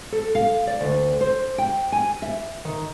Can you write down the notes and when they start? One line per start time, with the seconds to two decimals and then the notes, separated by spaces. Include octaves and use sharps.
0.12 A4
0.35 F5
0.67 D5
0.81 D2
1.21 C5
1.58 G5
1.92 G#5
2.22 E5
2.65 D#3